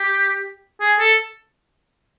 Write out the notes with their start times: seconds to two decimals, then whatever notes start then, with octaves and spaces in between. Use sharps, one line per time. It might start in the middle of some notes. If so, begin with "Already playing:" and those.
Already playing: G4
0.80 G#4
0.99 A4